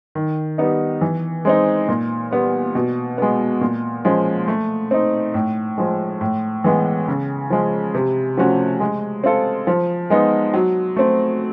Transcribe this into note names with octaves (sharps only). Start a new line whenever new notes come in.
D#3
G3 B3 D#4
E3
G#3 C4 D#4
A#2
G3 B3
B2
G#3 B3
A#2
F3 G#3 C#4
A3
C4 D#4
A2
F3 G#3
A2
E3 G#3 B3
C#3
F3 G#3
C3
F3 A3 C#4 F#4
G#3
C4 F4 A4
F3
G#3 B3 D#4
F#3
A3 C4